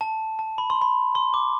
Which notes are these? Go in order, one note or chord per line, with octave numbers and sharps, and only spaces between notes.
A5
A5
B5
C6
B5
C6
D6